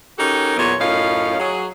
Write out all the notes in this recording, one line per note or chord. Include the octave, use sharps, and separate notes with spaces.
C#4 D#4 F#4 G4 A4 A#4
E2 A#2 E3 F#3 B3 C#5
F#2 A2 C#4 D#4 F4 F5
F#3 G#4